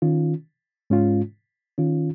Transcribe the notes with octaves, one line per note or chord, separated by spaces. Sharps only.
D#3 C#4 F4
G#2 G#3 C#4 F4
D#3 C#4 F4